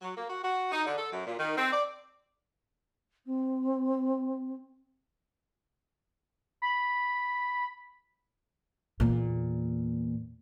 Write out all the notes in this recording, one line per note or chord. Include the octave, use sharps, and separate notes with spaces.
F#3
A#3
F#4
F#4
D#4
D3
A4
F#2
A#2
D#3
C4
D5
C4
B5
E2 A#2